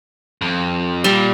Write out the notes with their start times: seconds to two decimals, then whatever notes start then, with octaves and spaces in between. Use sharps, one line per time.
0.41 F2
1.04 A#2 G3